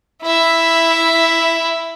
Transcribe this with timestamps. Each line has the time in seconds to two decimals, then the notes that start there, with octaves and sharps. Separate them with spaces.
0.23 E4 E5